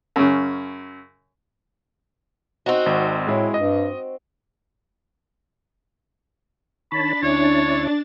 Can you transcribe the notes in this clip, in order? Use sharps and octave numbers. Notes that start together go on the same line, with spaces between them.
F#2 C#3
C4 D#4 F#4
G#1
A2 G#3 E4
G2 D#5
D#3 D4 C#5 A5 B5 A6
D2 C#4 E4 C#5